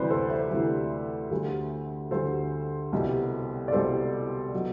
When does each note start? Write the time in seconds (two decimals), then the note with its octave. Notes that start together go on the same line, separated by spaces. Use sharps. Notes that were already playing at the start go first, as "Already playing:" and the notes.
Already playing: D2 C3 E3 G3 B4 C5 D5
0.10 A4 C5
0.30 C5 E5
0.51 D2 C3 E3 G3
1.31 D2 D3 G3
2.11 D2 D3 G3 A4 C5
2.93 C2 B2 G3
3.68 D5
3.72 C2 B2 G3 A4 C5
4.53 B2 F#3